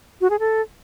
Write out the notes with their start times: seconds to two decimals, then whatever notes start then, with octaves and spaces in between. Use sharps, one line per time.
0.21 F#4
0.30 G#4
0.39 A4